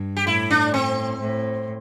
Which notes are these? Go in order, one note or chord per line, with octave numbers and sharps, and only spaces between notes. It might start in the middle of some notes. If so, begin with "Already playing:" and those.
Already playing: G2
G4
A2 E4
D4
C4
A2